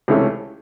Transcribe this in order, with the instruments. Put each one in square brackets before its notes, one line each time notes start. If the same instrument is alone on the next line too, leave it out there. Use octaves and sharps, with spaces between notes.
[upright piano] C#2 C3 E3 A3 C#4